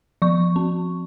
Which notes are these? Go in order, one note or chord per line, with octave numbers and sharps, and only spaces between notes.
F3 C#6
C4